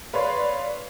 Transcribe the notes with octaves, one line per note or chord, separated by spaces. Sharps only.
B4 C#5 D5 F5 C6